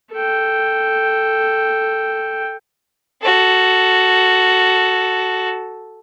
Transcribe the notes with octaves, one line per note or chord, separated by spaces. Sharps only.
A4 G5
F#4 A4